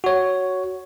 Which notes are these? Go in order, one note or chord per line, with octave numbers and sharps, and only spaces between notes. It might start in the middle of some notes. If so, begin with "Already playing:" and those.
F#4 C#5